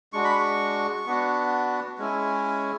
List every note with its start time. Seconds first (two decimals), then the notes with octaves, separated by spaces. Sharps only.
0.13 G#3 D4 F#4 C#6
0.24 B5
0.35 C#6
1.06 B3 D4 F#4
1.98 G#3 C#4 E4